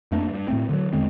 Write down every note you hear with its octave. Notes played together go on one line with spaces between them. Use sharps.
F2 A3 A#3 D4
G2
A2 A3 C4
D3 F3 F#3
E2 D3 G#3 C4